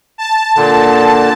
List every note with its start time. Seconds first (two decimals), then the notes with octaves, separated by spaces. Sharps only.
0.18 A5
0.56 A#2 D3